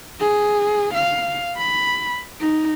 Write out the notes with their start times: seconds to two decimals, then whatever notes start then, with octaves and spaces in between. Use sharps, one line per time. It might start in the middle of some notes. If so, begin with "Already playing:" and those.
0.20 G#4
0.94 F5
1.58 B5
2.40 D#4